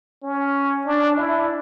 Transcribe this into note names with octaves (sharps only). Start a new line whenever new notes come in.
C#4
D4
E4